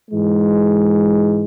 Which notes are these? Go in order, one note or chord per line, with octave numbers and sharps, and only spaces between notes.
G#2 E3 G#3